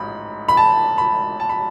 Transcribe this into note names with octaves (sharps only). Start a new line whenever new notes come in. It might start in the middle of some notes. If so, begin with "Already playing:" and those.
Already playing: A1 G#2 B5
B5
A5
B5
A5
B5